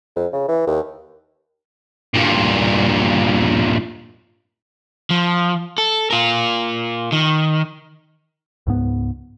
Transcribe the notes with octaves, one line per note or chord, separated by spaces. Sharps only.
F2
C#3
E3
D#2
G2 A#2
F3
A4
F4 A#4
D#3
C#2 G#2 B3